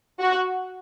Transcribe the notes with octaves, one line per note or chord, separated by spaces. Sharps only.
F#4